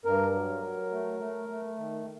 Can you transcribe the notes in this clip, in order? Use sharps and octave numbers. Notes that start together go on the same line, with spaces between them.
G2 A#4
F#3
F#3
A3
A3
A3
D#3